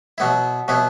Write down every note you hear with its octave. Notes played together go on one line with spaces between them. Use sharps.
B2 F#3 B3 E4
B2 F#3 B3 E4